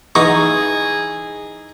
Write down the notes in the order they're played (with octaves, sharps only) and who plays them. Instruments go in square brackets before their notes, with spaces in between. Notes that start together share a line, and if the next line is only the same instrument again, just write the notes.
[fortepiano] E3 C#6 [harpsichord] D#4 [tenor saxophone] G#4